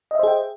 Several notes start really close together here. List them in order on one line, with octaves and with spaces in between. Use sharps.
D#5 E5 C5 G#4 G5